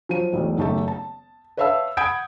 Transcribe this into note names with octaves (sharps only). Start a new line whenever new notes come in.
F3 F#3 D#7
E1 B1 A2
F#1 D#3 A3 G4 A5
A5
B4 C#5 E5 F5 A5 E6
F#5 B5 D#6 G6 G#6 D7